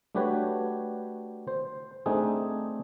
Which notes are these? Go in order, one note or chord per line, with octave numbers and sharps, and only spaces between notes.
A3 D4 F#4 G4 B4 C#5
C5
A3 C4 D4 D#4 G#4